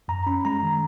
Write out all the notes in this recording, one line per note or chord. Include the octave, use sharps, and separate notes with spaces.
F#2 A#5
C#4 B5
G#3 A#5
D#3